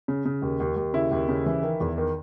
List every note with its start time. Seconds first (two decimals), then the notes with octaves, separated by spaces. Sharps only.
0.08 C#3
0.25 C#3
0.42 D#2
0.60 D#2
0.76 D#2
0.93 C#3 E4
1.11 D#2
1.29 C#3
1.46 E3
1.63 D#3
1.80 E2
1.98 D#3